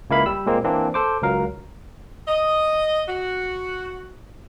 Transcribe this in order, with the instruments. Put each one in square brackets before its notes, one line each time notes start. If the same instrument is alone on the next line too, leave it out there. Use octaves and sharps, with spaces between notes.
[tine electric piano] C#2 A#3 E4 F5 B5
G3 E6
A#2 G#3 A#3 C4
E3 A#3 C4 D4
A4 C5 D6
C#2 F#3 A#4 F5
[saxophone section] D#5
F#4